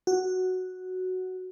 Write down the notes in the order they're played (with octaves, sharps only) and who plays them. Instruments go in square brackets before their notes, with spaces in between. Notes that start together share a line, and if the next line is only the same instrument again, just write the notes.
[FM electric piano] F#4